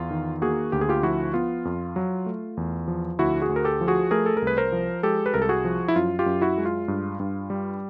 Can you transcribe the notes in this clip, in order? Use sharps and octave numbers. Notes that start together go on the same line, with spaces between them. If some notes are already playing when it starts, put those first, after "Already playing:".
Already playing: E2 F4
D#3
A#3 F#4 G#4
D2 G4
G#4
F4 G4
F3 E4 F#4
B3 F4
F2
F#3
A3
E2
F3
D2 E4 F#4
F#4 G#4
D2
A#4
G4 A4
F3
F#4 G#4
A3 G#4 A#4
A4
A#4
C2
B4
A#4 C5
F3
G#3 G4 A4
B4
C2 A#4
A4
F#4 G#4
F3
E4
F#2 F4
F4 G4
F#2
E4 F#4
G#3
F4
G2
G2
G3